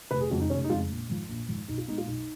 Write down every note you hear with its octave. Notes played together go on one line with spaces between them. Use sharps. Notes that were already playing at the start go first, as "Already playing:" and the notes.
F1 B4
G#4
F2 C#3 G#3 F#4
D#4
F1 C#4
D#4
F2 C#3 G#3 F4
A#1
G#2 F3
A#1
G#2 F3
B1 D#4
F4
A#2 G#3 B3 D#4
F4
B1 D#4